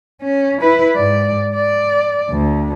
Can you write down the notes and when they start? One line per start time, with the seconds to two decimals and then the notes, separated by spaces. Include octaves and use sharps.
0.23 C#4
0.61 E4 B4
0.95 G#2 D5
1.55 D5
2.30 D2